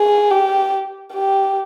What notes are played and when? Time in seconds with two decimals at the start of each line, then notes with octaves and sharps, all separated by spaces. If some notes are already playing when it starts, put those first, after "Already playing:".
Already playing: G#4
0.31 G4
1.14 G4